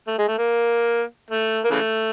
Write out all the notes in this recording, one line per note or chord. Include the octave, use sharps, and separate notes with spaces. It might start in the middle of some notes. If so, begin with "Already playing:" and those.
A3
G#3
A3
A#3
A3
A#3
C#3 E3 A3